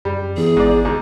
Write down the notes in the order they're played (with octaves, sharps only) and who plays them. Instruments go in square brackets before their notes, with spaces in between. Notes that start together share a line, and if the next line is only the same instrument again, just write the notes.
[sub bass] F#2 [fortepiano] G3
[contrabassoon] E2 [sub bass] E3 [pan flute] G#4
[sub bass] G#1 [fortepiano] G#2 D5
[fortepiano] D#2